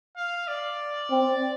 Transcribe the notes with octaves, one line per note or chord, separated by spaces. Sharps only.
F5
D5
C4